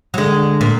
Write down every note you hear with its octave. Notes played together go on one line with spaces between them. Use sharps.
F#3
D3 G#3
A#2